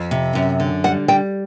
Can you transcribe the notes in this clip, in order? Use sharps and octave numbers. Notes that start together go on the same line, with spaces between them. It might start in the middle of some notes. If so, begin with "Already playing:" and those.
Already playing: F2
C3
F#2
D3
G3 F#5
G3 G5